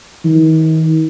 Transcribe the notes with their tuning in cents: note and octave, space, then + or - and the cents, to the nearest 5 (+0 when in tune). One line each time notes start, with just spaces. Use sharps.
D#3 +40